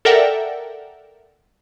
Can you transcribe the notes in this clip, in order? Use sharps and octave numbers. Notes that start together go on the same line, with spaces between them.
A4 A#4 D5 E5 F#5 G5